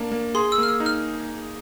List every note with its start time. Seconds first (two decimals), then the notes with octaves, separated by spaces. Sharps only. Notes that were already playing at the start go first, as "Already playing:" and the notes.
Already playing: A#3 D4
0.12 A#3
0.35 G#4 C6
0.52 E6
0.58 A#3
0.63 F6
0.68 E6
0.80 D#4
0.86 F6